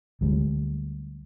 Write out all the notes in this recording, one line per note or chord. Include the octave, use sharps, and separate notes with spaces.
D2 G3 G#3